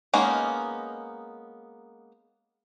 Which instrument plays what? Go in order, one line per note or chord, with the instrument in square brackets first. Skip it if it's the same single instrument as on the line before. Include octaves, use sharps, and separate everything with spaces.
[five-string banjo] G#3 A#3 B3 C#4 D#4